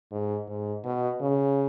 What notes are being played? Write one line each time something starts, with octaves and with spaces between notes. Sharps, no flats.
G#2
G#2
B2
C#3